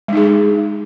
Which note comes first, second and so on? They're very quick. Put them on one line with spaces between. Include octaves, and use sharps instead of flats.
G#3 D#4 G#4